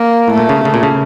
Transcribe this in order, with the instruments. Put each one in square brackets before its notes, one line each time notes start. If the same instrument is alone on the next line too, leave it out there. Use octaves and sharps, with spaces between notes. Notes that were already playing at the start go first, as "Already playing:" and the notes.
Already playing: [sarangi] A#3
[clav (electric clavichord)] A2
[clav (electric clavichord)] A#2 [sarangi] A3
[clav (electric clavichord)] C#3
C#3
A#2
C#3